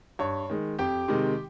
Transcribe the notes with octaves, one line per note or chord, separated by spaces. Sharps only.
G2 C#5
D#3 G#3
F2 G4 G5
C3 D#3 G#3